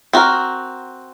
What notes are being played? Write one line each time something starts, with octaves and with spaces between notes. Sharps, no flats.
C4 F#4 A#4